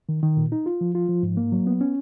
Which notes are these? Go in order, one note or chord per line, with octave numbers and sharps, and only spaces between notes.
D#3
D#3
A#2
D#4
F4
F3
F4
F3
G#2
A#3
F#3
B3
C#4